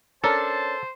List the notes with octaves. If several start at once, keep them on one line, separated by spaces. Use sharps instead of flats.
C#4 D4 A4 A#4 C5 A5